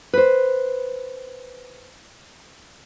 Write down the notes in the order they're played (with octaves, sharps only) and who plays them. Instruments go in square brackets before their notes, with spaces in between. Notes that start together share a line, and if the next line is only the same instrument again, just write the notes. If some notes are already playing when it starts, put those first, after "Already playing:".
[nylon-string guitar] B4 C5